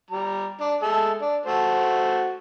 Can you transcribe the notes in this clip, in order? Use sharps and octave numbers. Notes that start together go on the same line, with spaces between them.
G3 A#5
D4
G#3 A4 E5
D4
A3 F#4 C5